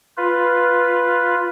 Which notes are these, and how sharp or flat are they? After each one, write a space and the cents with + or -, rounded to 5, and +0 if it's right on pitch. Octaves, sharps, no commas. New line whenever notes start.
F4 +0 B4 +0